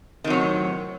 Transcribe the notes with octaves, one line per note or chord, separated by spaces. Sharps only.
A2 C3 D#3 F#3